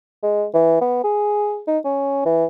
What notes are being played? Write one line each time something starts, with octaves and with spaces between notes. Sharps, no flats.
G#3
E3
B3
G#4
D#4
C#4
E3